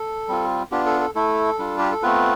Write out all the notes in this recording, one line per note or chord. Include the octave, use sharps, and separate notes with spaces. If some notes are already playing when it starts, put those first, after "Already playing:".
Already playing: A4
G3 C4 F4
B3 D4 F4 G4
A4
A4
A3 E4 A4
G3 D4 F4
G4
A4
A3 B3 C4 F4 B4